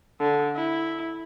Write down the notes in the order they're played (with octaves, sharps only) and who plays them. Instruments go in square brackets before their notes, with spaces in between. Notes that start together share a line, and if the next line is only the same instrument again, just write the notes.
[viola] D3
E4